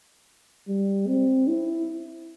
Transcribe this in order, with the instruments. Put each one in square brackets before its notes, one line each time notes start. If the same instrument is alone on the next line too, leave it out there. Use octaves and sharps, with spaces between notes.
[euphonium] G3
C4
E4